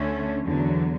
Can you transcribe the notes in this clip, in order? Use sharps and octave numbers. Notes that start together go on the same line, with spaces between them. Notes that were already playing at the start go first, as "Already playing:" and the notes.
Already playing: D2 D3 A3 C#4
E2 D3 F#3